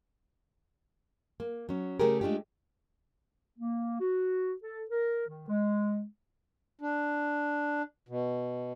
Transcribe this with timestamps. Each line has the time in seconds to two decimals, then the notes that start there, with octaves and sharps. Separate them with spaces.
1.40 A#3
1.69 F#3 C#4
2.00 C#3 A3 G4 G#4 A#4
2.21 G#3 A3 D4 F4 G4
3.59 A#3
4.00 F#4
4.63 A4
4.90 A#4
5.27 D#3
5.48 G#3
6.81 D4
8.09 B2